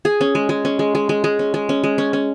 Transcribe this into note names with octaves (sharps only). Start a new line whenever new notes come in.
G#4
C#4
G#3
G#3
C#4
G#3
G#3
G#3
G#3
C#4
G#3
C#4
G#3
C#4
C#4